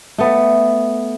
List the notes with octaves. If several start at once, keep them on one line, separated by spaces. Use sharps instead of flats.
A3 B3